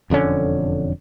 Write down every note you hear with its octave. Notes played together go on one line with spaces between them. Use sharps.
E1 F2 D3 C#4